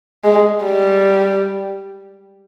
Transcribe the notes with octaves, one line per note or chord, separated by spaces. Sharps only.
G#3
G3